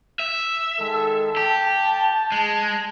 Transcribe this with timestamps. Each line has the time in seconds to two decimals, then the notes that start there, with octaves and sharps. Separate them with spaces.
0.19 E5
0.79 D#3 G#3 A4
1.37 G4 A5
2.32 G#3